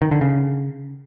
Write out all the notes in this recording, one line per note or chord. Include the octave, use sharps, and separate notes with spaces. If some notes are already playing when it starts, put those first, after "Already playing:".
D#3
D3
C#3